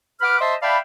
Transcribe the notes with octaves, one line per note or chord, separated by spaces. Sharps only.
B4 F#5 B5 D6 F6
C5 D#5 E5 A5 C6
D5 E5 F5 G5 A5 B5